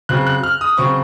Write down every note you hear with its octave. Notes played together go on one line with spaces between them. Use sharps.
C#3 F#3 C4 F#6
F#6
F6
D#6
C#3 F#3 C4 C#6